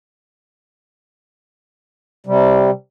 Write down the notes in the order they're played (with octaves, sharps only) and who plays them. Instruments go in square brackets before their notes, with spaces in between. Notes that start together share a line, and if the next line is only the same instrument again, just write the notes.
[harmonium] C3 G3